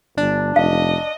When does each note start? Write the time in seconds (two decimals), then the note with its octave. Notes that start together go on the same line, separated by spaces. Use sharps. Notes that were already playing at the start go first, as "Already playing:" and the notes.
0.18 G1 D4
0.56 F1 D#5 F5